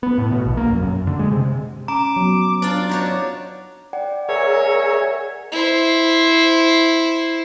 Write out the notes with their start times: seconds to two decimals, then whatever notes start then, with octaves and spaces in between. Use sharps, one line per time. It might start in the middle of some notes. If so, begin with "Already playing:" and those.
0.03 B3
0.18 A2
0.32 B2
0.46 A#1
0.57 A#3
0.70 F#2
0.82 F#2
1.07 D3
1.19 G#3
1.31 C3
1.88 C#4 A#5 D6
2.16 F#3 B3
2.62 D4 F4 D5
2.89 D4 D#4 F#4 C#5
3.93 D5 F#5 G5
4.29 G#4 A#4 C#5 E5
5.52 E4 C5